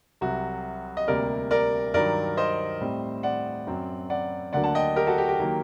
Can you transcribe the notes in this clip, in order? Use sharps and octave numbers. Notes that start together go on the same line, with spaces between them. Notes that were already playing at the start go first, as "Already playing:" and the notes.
C2 C3 F#3 F#4
D#5
D2 C3 G3 A#3 A#4 D5
A#4 D5
G2 D#3 F#3 A#4 D5
C5 D#5
A2 G3 C4
D5 F#5
F#2 F#3 C4
D5 F#5
D2 D3 F#3 A#3 D5 F#5
F#5 A5
D#5 G5
G4 A#4
F#4 A4
G4
G4
D#3 F#3 A#3